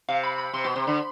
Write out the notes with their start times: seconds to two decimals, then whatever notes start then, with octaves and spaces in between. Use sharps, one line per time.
0.09 C3 F5
0.24 B5
0.38 B5
0.53 C3 C6
0.64 B2 C6
0.76 C3 C6
0.87 D3 B5